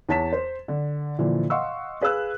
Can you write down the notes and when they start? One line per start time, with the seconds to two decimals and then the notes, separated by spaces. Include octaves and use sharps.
0.09 E2 C#5 A5 B6 E7
0.33 C5
0.68 D3
1.18 A#2 D3 E3 F3
1.50 D#5 F5 F#5 C6 C#6 E6
2.01 G#4 B4 F5 E6 F#6